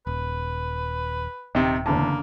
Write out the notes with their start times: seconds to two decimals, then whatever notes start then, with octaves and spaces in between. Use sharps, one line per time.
0.07 D#1 B4
1.55 D#1 C3 D#3
1.86 F#1 E2 D3 A#3 A5